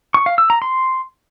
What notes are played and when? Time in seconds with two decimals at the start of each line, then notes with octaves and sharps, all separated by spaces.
0.14 C#6
0.26 F5
0.38 E6
0.50 A#5
0.62 C6